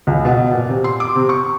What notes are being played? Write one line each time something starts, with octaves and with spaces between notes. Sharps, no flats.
C#2
B2
A#2
C3
C6
D6
C3
C#6